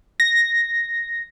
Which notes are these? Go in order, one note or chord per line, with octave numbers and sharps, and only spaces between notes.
A#6